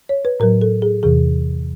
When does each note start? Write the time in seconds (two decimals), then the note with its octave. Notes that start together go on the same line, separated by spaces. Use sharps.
0.09 C#5
0.25 B4
0.40 A2 F#3 A#4
0.62 A4
0.82 G#4
1.03 E2 C3 E3 G#4